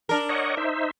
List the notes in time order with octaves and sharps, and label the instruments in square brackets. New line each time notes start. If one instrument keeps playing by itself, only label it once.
[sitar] D4 A#4
[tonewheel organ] C#5 D#5 F#5
D#4 C5 E5